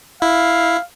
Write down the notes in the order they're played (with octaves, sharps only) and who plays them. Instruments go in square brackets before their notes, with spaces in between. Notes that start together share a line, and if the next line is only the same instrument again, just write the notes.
[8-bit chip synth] E4 [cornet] F5